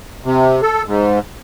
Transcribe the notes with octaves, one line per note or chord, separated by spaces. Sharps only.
C3
A4
G#2